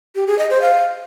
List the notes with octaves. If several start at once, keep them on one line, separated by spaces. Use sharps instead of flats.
G4
G#4
D#5
C5
F5